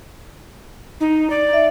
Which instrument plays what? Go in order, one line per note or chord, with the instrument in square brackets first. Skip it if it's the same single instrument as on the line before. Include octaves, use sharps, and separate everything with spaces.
[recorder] D#4
D5
[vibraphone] E5